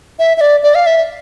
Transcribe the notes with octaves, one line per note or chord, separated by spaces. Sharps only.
E5
E5
D5
D5
F5
E5